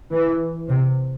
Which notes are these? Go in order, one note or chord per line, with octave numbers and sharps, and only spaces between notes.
E3
C3